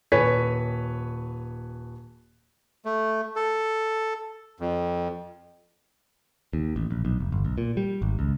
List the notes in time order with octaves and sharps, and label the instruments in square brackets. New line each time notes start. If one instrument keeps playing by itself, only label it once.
[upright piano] D#1 B4 C#5 G#5 B6
[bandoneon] A3
A4
F2
[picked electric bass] D#2
A1
A#1
B1
F1
G1
B1
A#2
G3
G#1
C#2